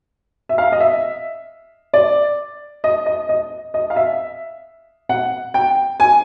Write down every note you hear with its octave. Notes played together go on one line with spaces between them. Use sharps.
E5
F5
D#5
E5
D5
D#5
D#5
D#5
D#5
F5
E5
F#5
G5
G#5